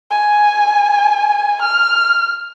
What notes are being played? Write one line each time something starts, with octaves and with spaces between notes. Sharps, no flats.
G#5
F6